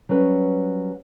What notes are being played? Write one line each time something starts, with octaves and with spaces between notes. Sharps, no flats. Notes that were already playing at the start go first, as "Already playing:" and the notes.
F#3 G3 C#4 B4